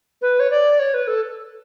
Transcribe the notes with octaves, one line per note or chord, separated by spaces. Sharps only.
B4
C#5
D5
C#5
B4
A4